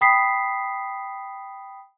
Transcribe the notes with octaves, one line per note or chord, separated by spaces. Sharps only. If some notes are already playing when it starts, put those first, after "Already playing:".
G5 B5 D#6 B6 C7